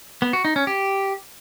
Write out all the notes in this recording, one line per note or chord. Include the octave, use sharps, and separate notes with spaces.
B3
F#4
D#4
C#4
G4